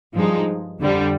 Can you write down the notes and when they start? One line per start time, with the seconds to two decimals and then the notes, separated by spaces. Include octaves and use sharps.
0.14 G2 F3 G#3 D#4
0.80 F2 D3 G3